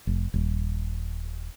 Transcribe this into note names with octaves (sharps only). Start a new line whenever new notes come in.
F1
D#1